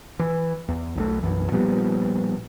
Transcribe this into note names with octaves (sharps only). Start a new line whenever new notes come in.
E3
E2
B1 F3 A3
B1 F#2 E3
A#2 F3 G3 B3